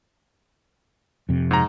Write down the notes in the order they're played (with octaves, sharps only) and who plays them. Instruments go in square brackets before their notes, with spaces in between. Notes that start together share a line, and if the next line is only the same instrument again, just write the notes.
[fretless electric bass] F2 C3
[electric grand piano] G#2 A#5